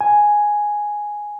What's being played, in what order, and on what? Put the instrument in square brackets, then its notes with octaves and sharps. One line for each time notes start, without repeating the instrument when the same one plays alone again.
[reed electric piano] G#5